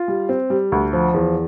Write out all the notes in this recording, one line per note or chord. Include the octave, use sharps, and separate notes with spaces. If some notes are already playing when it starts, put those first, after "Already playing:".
Already playing: F4
G3
C4
G3
D2
F3
E2